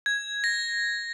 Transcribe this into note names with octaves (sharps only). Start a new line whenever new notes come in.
G#6
A#6